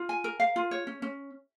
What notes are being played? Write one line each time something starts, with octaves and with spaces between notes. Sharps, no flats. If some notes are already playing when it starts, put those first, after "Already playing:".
Already playing: F4
G#5
A#4
F5
F4
C#5
C#4
C#4